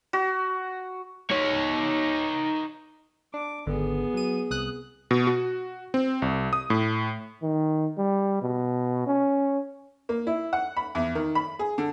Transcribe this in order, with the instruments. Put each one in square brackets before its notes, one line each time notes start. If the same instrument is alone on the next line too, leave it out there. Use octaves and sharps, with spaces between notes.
[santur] F#4
[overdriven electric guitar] D#4 C#5
[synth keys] D4 [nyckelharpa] D6
[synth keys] G#1 D3 [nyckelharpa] B3 G#4
[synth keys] F#3 D#7
C2 D#6 F#6
[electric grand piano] B2
F#4
C4
C2
D#6
A2
[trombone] D#3
G3
B2
C#4
[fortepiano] A#3
E4
F#5
B5
E2
D#3
B5
G#4
D3